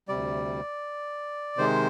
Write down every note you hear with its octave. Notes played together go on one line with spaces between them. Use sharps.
D2 C3 G3 D5
C3 D#3 G#3 C5